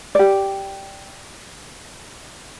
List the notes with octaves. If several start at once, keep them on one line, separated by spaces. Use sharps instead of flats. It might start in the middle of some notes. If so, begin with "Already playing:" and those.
G4 D5